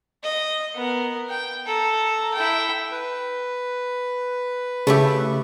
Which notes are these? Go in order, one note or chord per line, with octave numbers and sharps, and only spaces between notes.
D#5
B3 A#4
G5
A4 A#5
E4 G5
B4
C#3 A3 E4 G4 E5